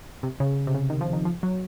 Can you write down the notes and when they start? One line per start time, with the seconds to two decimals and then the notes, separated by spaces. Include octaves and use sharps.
0.23 C3
0.40 C#3
0.67 C3
0.75 C#3
0.90 D#3
1.01 F3
1.13 D#3
1.25 F3
1.43 F#3